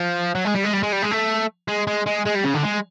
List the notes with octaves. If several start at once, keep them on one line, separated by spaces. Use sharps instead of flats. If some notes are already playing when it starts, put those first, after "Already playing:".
Already playing: F3
F#3
G#3
G3
G#3
G3
G#3
G3
G#3
A3
G#3
G#3
G#3
G#3
G3
C#3
D3
G#3